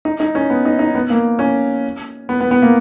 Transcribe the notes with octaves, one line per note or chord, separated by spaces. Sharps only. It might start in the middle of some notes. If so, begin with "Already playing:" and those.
D#4
D#4
C#4
B3
D#4
D#4
B3
A#3
C#4
B3
B3
B3
A#3